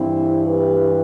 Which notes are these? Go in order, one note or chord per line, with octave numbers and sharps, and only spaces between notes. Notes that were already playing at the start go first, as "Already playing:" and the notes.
Already playing: G2 E3 C4 E4
G4 B4